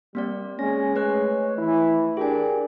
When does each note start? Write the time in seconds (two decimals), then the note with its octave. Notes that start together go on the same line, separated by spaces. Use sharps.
0.15 G3 A#3 C4 D5
0.59 G#3 C#4 A#6
0.95 A3 B4 C#5 F#6
1.58 E3 E4
2.17 D4 G4 G#4 A#4 G#5